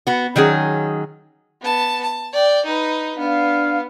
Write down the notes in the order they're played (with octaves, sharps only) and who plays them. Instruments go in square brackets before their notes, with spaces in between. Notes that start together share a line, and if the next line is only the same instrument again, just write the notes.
[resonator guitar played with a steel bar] B3 F#4
D#3 F#3 C#4 G#4
[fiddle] B3 A5
A5
D5 G5
D#4 B4
[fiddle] B3 [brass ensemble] D4 F5